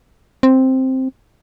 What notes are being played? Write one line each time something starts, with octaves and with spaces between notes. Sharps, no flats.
C4